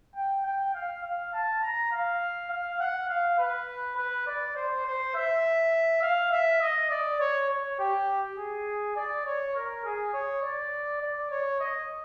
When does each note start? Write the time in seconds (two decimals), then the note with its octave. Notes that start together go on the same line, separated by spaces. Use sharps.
0.16 G5
0.46 G5
0.74 F5
1.04 F5
1.33 A5
1.62 A#5
1.92 F5
2.51 F5
2.80 F#5
3.09 F5
3.38 B4
3.97 B4
4.27 D5
4.56 C5
4.86 C5
5.15 E5
6.03 F5
6.32 E5
6.61 D#5
6.90 D5
7.20 C#5
7.49 C#5
7.79 G4
8.38 G#4
8.96 D5
9.26 C#5
9.55 A#4
9.85 G#4
10.13 C#5
10.42 D5
11.01 D5
11.31 C#5
11.60 D#5